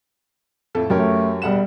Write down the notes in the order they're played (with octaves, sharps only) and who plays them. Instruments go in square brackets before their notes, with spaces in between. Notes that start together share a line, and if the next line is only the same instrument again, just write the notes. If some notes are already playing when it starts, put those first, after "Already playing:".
[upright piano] F2 A2 [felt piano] A4
[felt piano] F#2 [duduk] A3 [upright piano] G4 A#4 C#5
[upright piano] E1 F#5 E7 [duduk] G3